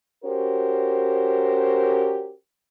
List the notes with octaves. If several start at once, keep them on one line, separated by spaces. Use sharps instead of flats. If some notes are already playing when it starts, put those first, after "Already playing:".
C#4 F#4 G4 A#4 C5